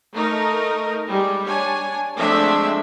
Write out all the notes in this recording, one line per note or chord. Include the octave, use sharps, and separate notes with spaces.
A3 D#4 A#4 A#5
G3 G#3
D4 C#5 G#5
F3 G#3 A3 C4 D4 E5